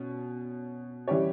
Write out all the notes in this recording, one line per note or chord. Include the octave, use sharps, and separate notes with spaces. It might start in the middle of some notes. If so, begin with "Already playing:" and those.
Already playing: B2 C#4
E3 G3 C#4 G4 C#5